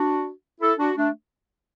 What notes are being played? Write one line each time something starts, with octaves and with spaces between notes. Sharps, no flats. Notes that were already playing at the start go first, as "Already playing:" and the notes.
Already playing: D4 F#4
E4 A4
D4 F#4
A3 D4